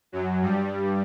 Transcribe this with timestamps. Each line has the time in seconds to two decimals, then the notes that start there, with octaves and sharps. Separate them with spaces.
0.12 F#2 F#3
0.42 G2 G3